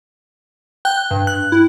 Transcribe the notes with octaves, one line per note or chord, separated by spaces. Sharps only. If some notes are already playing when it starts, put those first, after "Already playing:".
G5 F#6
G2
F#6
E4